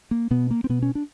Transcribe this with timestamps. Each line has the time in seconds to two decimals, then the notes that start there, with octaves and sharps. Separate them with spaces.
0.11 A#3
0.31 B2 B3
0.51 A#3
0.64 C4
0.69 B2 B3
0.82 C#4
0.95 D4